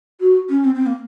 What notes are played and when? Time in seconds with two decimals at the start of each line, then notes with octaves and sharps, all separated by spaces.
0.20 F#4
0.49 C#4
0.65 C4
0.75 C4
0.86 A#3